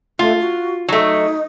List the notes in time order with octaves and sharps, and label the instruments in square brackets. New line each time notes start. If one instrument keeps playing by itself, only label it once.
[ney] A3 [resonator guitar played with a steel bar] F4
[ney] F#4
[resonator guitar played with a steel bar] F#3 A3 [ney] D#4